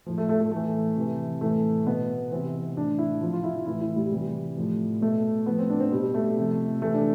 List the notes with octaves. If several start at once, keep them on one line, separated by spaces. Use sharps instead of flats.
A2 F3
A3
A3
A3
A2 E3 A3
C3 E3
A2 E3 A3
B2 B3
C3 E3 C4
A2 E3 D4
E4
C3 F3 F4
F4
E4
E4
A2 E3 E4
E4
G3
C3 E3 G3
A2 F3
B2 A3
A2 F3 B3
C4
D4
C4
B2 G3
A3
C3 F3
C3 E3 A3
D4